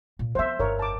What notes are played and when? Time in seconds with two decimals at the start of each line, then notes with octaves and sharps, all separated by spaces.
0.19 A#2
0.35 F3 B3 C5 E5
0.59 G1 F2 A#4 C#5
0.79 A5 D6